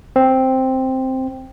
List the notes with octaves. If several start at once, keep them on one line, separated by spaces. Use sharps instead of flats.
C4